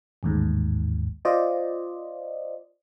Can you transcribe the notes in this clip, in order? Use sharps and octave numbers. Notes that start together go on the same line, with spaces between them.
A1 D#2 G#2
F4 C5 D5 D#5